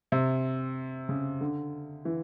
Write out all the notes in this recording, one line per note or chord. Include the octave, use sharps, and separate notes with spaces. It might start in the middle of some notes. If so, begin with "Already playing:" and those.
C3
C#3
D3
E3